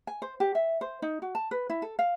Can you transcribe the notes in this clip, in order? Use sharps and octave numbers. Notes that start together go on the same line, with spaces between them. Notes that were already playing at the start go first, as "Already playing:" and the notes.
G#5
C5
G4
E5
C5
D#4
F#4
A5
B4
E4
A4
F5